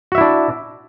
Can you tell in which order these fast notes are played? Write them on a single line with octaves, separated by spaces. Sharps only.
F#4 E5 E4 D4